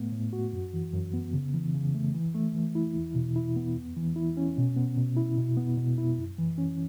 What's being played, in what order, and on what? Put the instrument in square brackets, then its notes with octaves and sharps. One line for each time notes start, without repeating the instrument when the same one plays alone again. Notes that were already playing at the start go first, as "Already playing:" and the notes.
Already playing: [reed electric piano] A2 A3 B3
A2
F#4
F#2
E3
F#2
B3
C#3
E3
C#3
A3
E3
A3
E3
E4
E2
B2
E4
B3
E2
E3
E4
C#4
B2
B3
B2
E4
B2
B3
B2
E4
F#2
E3
C#4